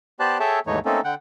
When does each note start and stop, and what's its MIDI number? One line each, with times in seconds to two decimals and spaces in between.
0.20 0.38 59
0.20 0.38 67
0.20 0.38 72
0.20 0.38 74
0.20 0.38 81
0.20 0.38 90
0.40 0.59 68
0.40 0.59 69
0.40 0.59 73
0.40 0.59 76
0.40 0.59 79
0.40 0.59 81
0.67 0.79 39
0.67 0.79 44
0.67 0.79 52
0.67 0.79 57
0.67 0.79 63
0.67 0.79 73
0.85 1.01 57
0.85 1.01 58
0.85 1.01 60
0.85 1.01 61
0.85 1.01 63
0.85 1.01 69
1.04 1.15 50
1.04 1.15 78
1.04 1.15 79